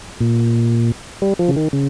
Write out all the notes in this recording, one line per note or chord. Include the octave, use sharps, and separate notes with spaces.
A#2
G3
F3
C#3
D#3
C#3